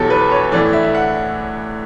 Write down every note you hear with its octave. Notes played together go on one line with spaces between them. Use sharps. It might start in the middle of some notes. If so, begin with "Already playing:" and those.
Already playing: E2 B2 F#3 G4 A4
B4
C#5
A2 E3 A3 D5
E5
E5
F#5